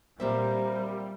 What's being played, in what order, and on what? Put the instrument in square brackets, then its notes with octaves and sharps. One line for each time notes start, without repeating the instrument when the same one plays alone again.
[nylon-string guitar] A#2 C4 E5 [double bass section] G3 [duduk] A#4 [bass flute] C5